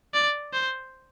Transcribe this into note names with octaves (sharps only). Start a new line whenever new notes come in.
D5
C5